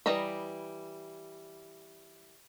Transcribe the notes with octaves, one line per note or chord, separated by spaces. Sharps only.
E3 G3 D#5 A#5 B5